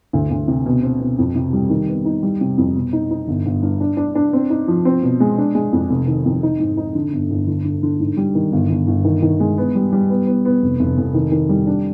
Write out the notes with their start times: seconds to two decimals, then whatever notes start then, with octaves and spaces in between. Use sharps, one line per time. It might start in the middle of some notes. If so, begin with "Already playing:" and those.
0.13 D2
0.31 D2
0.48 C3
0.66 B2
0.83 C4
1.00 B2
1.18 F2
1.36 C3
1.53 G3
1.70 D#3
1.88 B3
2.05 D#4
2.23 G3
2.41 C3
2.58 F2
2.76 B2
2.93 D#4
3.11 D#4
3.28 G1
3.46 G1
3.63 G2
3.81 D4
3.97 D4
4.15 D4
4.33 C4
4.50 D#4
4.68 F3
4.85 C4
5.03 B2
5.20 G#3
5.38 D4
5.55 G#3
5.73 F2
5.90 F1
6.07 D#3
6.25 F2
6.43 D#4
6.59 G#2
6.77 D#4
6.95 D3
7.13 G1
7.30 G1
7.47 D3
7.65 D3
7.83 D3
8.00 G#2
8.17 G3
8.35 D#3
8.52 G1
8.70 G1
8.87 G1
9.05 D#3
9.22 D#3
9.40 G#3
9.58 B3
9.75 G3
9.93 G3
10.10 B3
10.27 B3
10.45 B3
10.62 F1
10.79 F1
10.97 F1
11.14 D#3
11.32 D#3
11.49 G3
11.67 D4